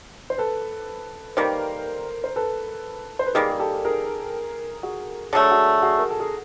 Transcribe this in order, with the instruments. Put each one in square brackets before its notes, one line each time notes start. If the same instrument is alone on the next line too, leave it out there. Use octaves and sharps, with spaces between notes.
[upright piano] C5
A4 B4
[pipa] D#3 G3 A#3 [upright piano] A#4 C5
[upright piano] C5
A4 B4
C5
B4
[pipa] D#3 G3 A#3 [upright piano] G#4 A#4
[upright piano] G#4
G4 A4
G#4 A#4
F#4 G#4
[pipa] D3 F#3 A3 [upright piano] G#4
[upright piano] A4
F#4 G#4
F#4 G#4
A#4
A4
G#4